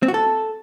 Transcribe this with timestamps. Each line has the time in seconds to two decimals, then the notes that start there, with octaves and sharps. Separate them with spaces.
0.03 C4
0.08 F#4
0.14 A4